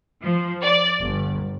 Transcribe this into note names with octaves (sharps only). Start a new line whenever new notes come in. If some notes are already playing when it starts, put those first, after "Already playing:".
F3
D5
G1